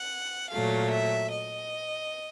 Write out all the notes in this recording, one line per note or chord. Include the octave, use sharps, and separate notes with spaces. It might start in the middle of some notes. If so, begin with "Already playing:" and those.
Already playing: F#5
A#2 F#3 A3 F5
E5
D#5